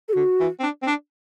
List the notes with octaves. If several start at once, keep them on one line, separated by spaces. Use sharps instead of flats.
A4
D3 F#4
E3
C4
D4
C4
D4